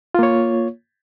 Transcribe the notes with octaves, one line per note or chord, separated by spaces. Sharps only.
A#3 F4 C#5